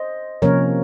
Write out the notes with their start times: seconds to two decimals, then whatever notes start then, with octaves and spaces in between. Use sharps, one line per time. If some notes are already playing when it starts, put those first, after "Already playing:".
Already playing: C5 D#5
0.42 C3 F3 A#3 C#4 A#4 C#5